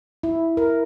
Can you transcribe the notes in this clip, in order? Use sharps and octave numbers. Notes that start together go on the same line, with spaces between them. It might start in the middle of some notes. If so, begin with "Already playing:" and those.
E4
A#4